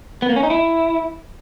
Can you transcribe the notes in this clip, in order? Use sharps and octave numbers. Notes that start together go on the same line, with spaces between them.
B3
A#3
C#4
D#4
E4